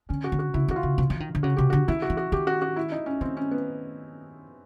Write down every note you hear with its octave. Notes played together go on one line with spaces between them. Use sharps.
D3 C#4
F#4
D3
F#4
C#3 E4
D#3 F#4
F4
C#3
C3
E3
D#3
D3
C#3 F#4
C3 G4
D3 F#4
D#3 E4
F#4
E3
F#4
D#3 G4
F#4
F#4
E4
D#4
C#4
D#3 C4
C#4
B3